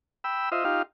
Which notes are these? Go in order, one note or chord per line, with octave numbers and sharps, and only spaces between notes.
G5 B5 E6
F4 C5 D#5 E5
D#4 F4 G4 F5